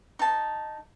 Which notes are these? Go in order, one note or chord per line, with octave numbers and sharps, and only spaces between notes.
D#4 A5